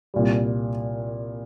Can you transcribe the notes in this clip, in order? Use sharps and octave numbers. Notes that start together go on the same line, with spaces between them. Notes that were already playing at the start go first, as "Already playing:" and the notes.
C2 A#2 G3